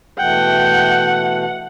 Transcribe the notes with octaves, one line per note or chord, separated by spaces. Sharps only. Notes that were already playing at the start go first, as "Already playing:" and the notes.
B2 E3 A3 F#5 G5